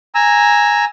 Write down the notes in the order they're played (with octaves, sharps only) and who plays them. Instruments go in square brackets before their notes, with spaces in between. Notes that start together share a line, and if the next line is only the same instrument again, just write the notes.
[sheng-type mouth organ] G#5 A#5 E6